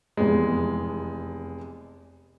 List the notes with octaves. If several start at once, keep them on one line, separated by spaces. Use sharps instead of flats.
F1 E2 G#3